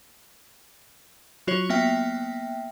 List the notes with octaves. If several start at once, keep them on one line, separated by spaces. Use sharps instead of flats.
F#3 F4 F#4 C#5
A#3 B3 E5 G5